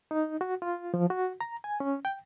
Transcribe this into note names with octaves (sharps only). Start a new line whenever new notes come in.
D#4
F#4
F4
F3
F#4
A#5
G#5
C#4
G5